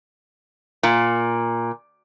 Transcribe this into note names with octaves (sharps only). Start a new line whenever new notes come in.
A#2